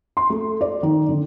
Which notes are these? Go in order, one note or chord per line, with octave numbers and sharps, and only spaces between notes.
C6
A3
D5
D#3
D3